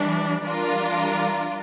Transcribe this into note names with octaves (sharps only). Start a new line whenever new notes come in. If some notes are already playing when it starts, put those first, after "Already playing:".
Already playing: E3 G3 D4
E3 G3 D4 F4 A#4